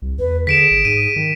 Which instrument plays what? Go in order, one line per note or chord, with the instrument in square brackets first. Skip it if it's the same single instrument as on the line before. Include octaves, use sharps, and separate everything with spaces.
[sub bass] C2
[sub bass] E2 [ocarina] B4
[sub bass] D3 [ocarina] G#4 [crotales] B6 D7 E7
[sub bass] G#1
[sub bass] G#2 [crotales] D#7
[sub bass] D#3